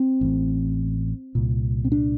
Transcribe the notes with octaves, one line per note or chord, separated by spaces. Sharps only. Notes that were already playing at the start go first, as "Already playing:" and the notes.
Already playing: C4
A1 A2
C2 A#2
C4
D4